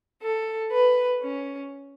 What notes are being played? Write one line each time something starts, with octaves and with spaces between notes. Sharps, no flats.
A4
B4
C#4